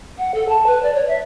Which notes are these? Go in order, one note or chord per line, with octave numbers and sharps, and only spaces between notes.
F#5
A4
A5
B4
D5
C#5
E5